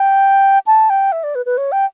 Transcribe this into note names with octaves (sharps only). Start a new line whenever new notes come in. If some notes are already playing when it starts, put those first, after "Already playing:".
Already playing: G5
A5
G5
E5
D5
B4
B4
C#5
G5